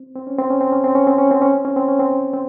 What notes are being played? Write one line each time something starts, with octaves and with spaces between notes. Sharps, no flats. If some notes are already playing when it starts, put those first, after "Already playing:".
Already playing: C4
C4
C#4
C4
C#4
C4
C#4
C4
C#4
C4
C#4
C4
C#4
C4
C#4
C4
C#4
C4
C4